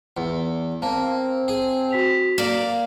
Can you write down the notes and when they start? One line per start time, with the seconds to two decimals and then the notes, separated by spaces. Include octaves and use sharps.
0.17 E2
0.82 A#3 C4 C5 F5 A5
1.48 G#4
1.91 F#4 B6 F7
2.38 A#3 D5 F5